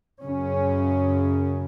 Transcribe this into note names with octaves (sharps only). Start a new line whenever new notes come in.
F#2 C#3 C#4